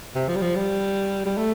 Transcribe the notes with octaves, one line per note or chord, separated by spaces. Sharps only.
C3
F3
G3
F3
G3
G3
A3